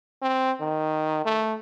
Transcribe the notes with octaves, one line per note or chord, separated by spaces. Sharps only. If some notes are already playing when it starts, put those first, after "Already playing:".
C4
D#3
A3